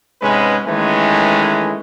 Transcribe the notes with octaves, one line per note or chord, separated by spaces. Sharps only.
G#2 C3 G#3 C#4 B4
D#3 E3 G#3 A3 C#4 B4